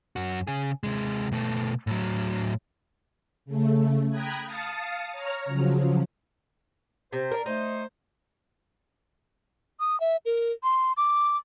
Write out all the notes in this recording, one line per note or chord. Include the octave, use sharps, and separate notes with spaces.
F#2 F#4
C#3 G#4
C3 G#3
B2 A3
A2 F#3
C#3 A3
G5 A#5 B5 D#6 F#6 G#6
F5 A5 D#6 A6 C#7
C#5 A#5 F6
C#3 F3 F#3
C3 C5
D4 A#4
A3 D#4 C5
D#6
E5
A#4
C6
D6